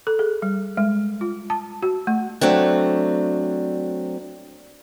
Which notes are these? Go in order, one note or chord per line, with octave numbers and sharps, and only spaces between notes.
A4
G#4
G3
G#3
F4
A5
F#4
A3
F#3 A3 C4 D4